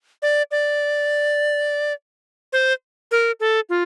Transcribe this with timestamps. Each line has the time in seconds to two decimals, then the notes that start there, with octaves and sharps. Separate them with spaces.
0.22 D5
0.51 D5
2.53 C5
3.11 A#4
3.40 A4
3.69 F4